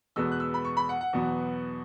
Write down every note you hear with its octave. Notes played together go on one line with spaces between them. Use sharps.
E2 B2 G#3 B3 E6
F#6
E6
B5
C#6
B5
F#5
F#5
E2 B2 F#3 B3